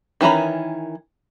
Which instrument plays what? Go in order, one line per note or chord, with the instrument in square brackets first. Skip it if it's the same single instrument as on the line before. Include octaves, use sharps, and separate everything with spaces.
[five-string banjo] D#3 E3 C#4 A#5 B5